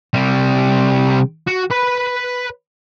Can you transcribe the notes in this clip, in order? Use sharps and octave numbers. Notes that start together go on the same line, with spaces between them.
C3 G3
F#4
B4 B5